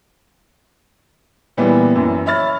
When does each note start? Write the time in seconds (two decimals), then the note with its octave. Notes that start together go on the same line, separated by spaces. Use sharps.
1.57 A#2 E3 G3 B3
1.95 F#2 E3
2.26 C#5 E5 B5 F6 A6